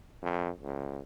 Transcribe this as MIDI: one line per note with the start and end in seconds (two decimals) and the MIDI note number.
0.23 0.50 41
0.61 1.00 37